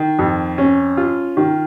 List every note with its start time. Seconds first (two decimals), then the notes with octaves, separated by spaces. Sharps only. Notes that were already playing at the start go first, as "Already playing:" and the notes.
Already playing: D#3
0.19 F2
0.58 C#4
0.97 F4
1.37 D#3